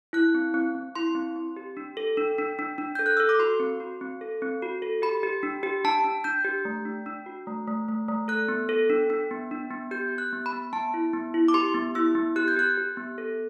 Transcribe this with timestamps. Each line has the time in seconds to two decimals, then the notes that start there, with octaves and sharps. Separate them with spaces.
0.13 E4 F#6
0.35 C4
0.54 C4
0.75 C4
0.95 E4 C6
1.15 C4
1.36 C4
1.57 G4
1.77 D4
1.97 A4
2.17 D4
2.38 D4
2.59 D4
2.78 D4
2.95 A4 G6
3.06 F#6
3.17 A4 E6
3.29 D6
3.39 F#4 C6
3.60 C4
3.80 F#4
4.01 C4
4.21 A4
4.42 C4
4.62 F#4
4.82 A4
5.02 G4 B5
5.23 G4
5.43 D4
5.63 G4
5.84 D4 A5
6.04 D4
6.24 D4 G6
6.45 G4
6.65 A3
6.85 D4
7.06 D4
7.26 F#4
7.47 A3
7.68 A3
7.88 A3
8.09 A3
8.28 A4 F#6
8.48 B3
8.69 A4
8.89 D4
9.10 D4
9.31 B3
9.51 D4
9.71 B3
9.91 G4 G6
10.12 G4
10.18 F#6
10.33 B3
10.46 B5
10.53 B3
10.73 B3 A5
10.94 E4
11.13 B3
11.34 E4
11.48 D6
11.54 G4 C6
11.74 B3
11.95 E4 E6
12.15 B3
12.36 G4 F#6
12.48 G6
12.56 G4 F#6
12.77 G4
12.97 B3
13.18 A4